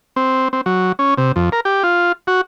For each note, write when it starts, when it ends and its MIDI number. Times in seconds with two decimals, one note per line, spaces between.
0.16 0.48 60
0.53 0.61 60
0.66 0.92 54
0.99 1.14 61
1.18 1.32 48
1.36 1.49 41
1.52 1.60 70
1.65 1.83 67
1.83 2.12 65
2.27 2.41 66